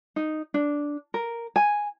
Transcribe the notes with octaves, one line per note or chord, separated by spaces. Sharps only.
D#4
D4
A#4
G#5